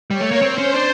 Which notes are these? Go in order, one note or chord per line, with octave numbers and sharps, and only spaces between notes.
G3 C#5
A3
A#3
C4 C5
C#4
D4